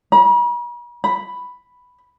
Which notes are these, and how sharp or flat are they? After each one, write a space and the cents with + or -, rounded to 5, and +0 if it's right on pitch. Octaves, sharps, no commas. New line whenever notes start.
B5 -45
B5 +5